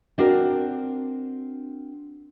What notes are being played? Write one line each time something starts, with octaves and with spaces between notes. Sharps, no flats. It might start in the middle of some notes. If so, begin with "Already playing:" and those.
C4 D4 F#4 A#4